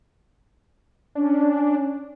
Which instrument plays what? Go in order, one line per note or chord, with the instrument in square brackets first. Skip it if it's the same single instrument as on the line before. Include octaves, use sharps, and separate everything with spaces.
[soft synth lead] C#4 [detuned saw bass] D4